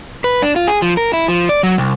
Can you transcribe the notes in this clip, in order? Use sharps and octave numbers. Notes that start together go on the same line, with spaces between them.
B4
D4
F4
G#4
F3
A#4
E4
F3
D5
F#3
C2